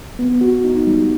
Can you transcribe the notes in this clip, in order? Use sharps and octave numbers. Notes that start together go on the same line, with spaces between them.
B3
F#4
D#4
G3